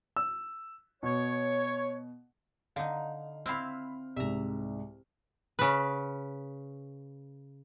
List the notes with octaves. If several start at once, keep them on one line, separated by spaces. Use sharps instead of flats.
E6
B2 C#5
D3 D#4 F5
C4 E4 F5 B5 F6
C2 G#2 E5 A#5
C#3 B4